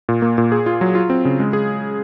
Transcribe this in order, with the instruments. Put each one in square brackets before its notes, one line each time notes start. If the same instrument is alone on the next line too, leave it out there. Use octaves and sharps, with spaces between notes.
[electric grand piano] A#2
A#3
A#2
G#4
F4
F#3
F4
C4
C#3
G#3
G#4